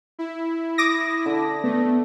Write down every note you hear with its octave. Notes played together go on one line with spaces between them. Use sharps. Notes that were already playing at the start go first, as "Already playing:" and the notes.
E4
D6 D#6 A#6
D3
A3 B3